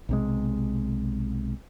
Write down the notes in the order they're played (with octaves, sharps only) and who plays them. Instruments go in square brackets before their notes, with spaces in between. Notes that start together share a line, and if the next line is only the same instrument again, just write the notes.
[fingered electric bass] B1 C3 G#3